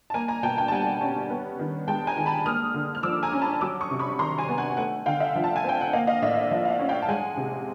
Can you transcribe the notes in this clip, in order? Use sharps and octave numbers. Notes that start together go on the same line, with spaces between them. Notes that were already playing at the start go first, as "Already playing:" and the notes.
A5
A#3 G#5 A#5
G#5 A#5
B2 G5 A5
G5 A5
A5
G3 F#5 G#5
C#4
B3
D#3
G#3 G5 A5
G#5 A#5
D#3
A5 B5
A#3 D#6 F6
D3
F6
F3 D6 E6
G#5 A#5
C#4
A5 B5
F#3 D6 E6
C#6 D#6
C3
B5 C#6
D#3 A#5 C6
G#5 A#5
B3
F#5 G#5
A3 F#5 G#5
D3 F5 G5
E5 F#5
F3
A5
G#5
C4 G5
F#5
A#3 D#5 F5
D#5 F5
A2 D5 E5
D#5
F3 D5 E5
F5
E5 F#5
C#4
F5 G5
A5
G#3 F#5 G#5
C3